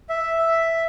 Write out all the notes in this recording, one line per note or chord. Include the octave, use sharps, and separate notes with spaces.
E5